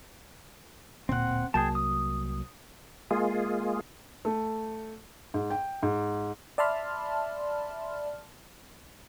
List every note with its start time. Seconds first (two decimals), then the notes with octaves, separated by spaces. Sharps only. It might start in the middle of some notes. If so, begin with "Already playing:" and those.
1.09 D1 A#2 C4 F#5
1.54 C2 F#3 A#3 G#4 G5 A5
1.75 D#6
3.11 G#3 A#3 F4 G#4
4.25 A3
5.34 G#2
5.50 G5
5.83 G#2
6.58 D5 E5 A5 B5 C6 F6